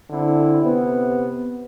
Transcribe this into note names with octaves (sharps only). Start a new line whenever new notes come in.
D3 C4 E4
C3 B3